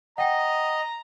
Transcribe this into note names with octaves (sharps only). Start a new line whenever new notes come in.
D#5 F#5 G5 A#5